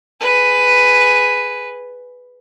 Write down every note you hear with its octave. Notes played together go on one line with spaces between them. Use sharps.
G#4 B4